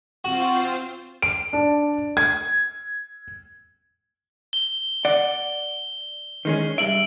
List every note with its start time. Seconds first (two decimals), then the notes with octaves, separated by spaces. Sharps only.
0.24 C4 F4 F#4 C5
1.22 D7
1.53 D4
2.17 G#6
4.53 G7
5.05 D5 F#5
6.45 D#3 G#3 C#4
6.78 G2 E5 D7 F#7